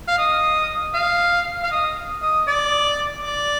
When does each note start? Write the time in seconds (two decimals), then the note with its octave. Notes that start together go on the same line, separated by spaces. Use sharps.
0.08 F5
0.18 D#5
0.94 F5
1.63 F5
1.72 D#5
2.22 D#5
2.48 D5
3.24 D5